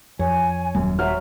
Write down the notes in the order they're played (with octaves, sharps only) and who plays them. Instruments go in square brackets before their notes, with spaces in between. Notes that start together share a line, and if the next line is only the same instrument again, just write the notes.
[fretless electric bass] F2 [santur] C#5 [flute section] G#5
[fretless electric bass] D#1 [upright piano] F#2
[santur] F#3 C5 C6 [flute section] E5 [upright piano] F6